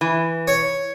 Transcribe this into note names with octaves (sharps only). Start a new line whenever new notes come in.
E3
C#5